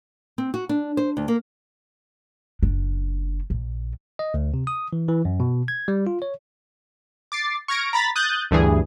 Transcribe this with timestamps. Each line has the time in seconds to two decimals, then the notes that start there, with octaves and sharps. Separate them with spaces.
0.38 C4
0.54 F#4
0.69 D4
0.97 C5
1.17 D2
1.28 A#3
2.63 F#1 D4
3.50 A#1
4.19 D#5
4.34 D2
4.54 C3
4.67 D#6
4.93 E3
5.08 E3
5.25 F#2
5.40 B2
5.68 G#6
5.88 G3
6.07 F4
6.22 C#5
7.32 D6 A6 C7
7.68 C#6 F6 G#6 A#6 D7
7.93 A#5 B5 A6 B6
8.16 D#6 F#6 G6 A6
8.51 D2 G2 E3 G#4